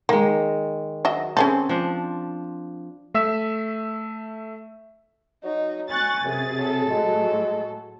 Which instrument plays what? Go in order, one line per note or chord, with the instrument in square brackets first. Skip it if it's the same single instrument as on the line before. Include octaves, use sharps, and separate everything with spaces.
[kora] D#3 G#3 [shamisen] A#3
[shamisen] F#3 D#5 E5
[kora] C4 [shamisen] C#4 G#4 A4
[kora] F3 D4
[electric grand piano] A3 E5 E6 B6 E7
[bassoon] F#3 [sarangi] D#4
[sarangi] G#5 [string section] C#6 F#6 A6
[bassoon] F#2 [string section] C3 G#4 A6
[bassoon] F#3 [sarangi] A4
[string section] A2 F#3 [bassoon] G#3